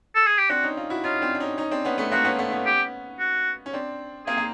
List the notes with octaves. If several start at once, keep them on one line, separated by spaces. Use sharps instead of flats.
A4
G#4
G4
C4 D4 F#4
C#4 D#4
D#4 F4
E4 F#4
C#4 D#4 F4
C4 D4
D4
C#4 D#4
C#4 D#4
C4 D4
B3 C#4
A3 B3
A#3 C4 F#4
B3 C#4
A3 B3
B3 C#4
G4
F#4
C#4
C4 D4
A#3 C4 G#4
A#3